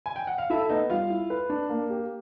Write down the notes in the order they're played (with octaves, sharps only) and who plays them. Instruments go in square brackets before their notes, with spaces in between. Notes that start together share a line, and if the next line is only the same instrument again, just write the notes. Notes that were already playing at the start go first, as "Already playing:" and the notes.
[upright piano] G#5
G5
F#5
F5
[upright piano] E4 E5 [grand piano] A4
[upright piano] E5
[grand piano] B3 [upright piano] D#4 D#5
[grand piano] G3 [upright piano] F4 F5
[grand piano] E4
B4
D4
A#3
G4